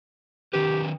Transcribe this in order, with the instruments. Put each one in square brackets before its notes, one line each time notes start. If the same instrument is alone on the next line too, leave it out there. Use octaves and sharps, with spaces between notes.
[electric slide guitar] D#3 C#4 B4 [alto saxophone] G4